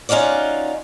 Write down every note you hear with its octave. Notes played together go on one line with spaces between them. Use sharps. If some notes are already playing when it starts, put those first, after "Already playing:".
C#4 D#4 F4 F#4 D5